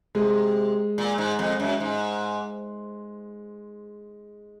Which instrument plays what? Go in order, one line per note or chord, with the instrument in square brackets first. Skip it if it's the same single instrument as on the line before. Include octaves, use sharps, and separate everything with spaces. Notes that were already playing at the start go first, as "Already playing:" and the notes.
[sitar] C3 [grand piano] G#3
[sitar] A#2
G#2
F2
F#2
G#2